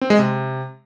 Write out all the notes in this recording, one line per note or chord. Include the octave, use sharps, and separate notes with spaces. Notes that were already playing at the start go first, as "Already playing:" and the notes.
C4
G#3
C3